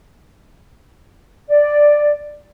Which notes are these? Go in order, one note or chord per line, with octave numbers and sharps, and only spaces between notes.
D5